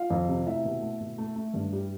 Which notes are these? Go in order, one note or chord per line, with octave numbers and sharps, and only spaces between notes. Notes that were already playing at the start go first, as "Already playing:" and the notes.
Already playing: F4 F5
F2
C3
A3 E4 E5
B2
A3
B2
A3
A3
G2
G3